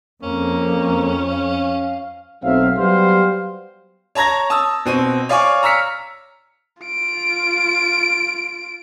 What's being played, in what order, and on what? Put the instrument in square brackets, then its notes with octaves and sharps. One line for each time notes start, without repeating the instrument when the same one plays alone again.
[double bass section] F2 [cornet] A#3 [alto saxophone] C#4
[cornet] F5
[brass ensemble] B1 F#3 A3 C4 E5 F5
F#3 G3 B3 G4 C5 F5
[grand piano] C#5 A5 A#5 G#6 A#6
A5 D#6 E6
B2 C4 D#7
C#5 D5 F5 G#5 C#6 D6
A#5 E6 F6 B6 C#7
[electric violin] F4 D7